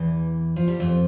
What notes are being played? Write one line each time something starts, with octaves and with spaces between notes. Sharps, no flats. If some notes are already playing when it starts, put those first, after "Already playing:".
Already playing: E2 E3
F3
G3
F2 F3